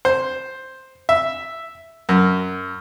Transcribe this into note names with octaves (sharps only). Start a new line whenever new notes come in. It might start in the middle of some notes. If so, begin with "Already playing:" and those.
C5
E5
F#2